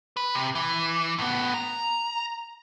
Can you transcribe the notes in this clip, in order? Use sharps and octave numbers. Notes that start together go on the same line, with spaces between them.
B4
C3
E3
A2 B3
A#5